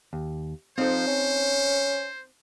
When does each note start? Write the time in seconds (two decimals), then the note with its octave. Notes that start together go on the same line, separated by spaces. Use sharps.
0.13 D#2
0.78 F3 C4 D#4 A4 C5
1.07 C#4